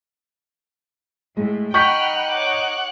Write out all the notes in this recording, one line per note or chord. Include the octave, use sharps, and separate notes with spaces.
A2 G#3
D#4 F#5 G5 B5 C#6 F6 G6 B6
C#5 D6